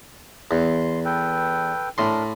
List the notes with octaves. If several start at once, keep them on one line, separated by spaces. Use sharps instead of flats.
E2 C6
A4 B4 G5
A2 D4 A#4 C6